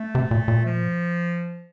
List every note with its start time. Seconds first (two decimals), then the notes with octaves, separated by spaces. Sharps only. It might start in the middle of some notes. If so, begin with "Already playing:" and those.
Already playing: A3
0.15 C3
0.31 A#2
0.48 A#2
0.65 F3